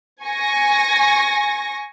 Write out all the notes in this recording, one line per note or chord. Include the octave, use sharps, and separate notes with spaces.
G#5 C#6 A#6